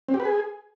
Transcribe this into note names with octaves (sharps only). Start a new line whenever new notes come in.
C4
G4
B4
G#4